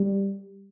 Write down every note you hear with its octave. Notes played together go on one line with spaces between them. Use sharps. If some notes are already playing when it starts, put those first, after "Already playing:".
Already playing: G3